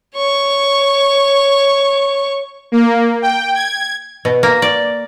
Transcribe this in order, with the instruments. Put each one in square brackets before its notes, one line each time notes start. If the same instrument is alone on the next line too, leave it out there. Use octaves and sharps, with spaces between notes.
[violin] C#5 C#6
[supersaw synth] A#3
G5
G#6
[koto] B2
A#3
D5